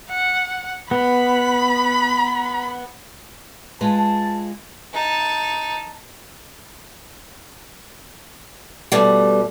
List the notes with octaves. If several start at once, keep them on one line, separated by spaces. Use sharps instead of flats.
F#5
B3 B5
G#3 F4 B4 A5
D#4 A5
B2 G3 A3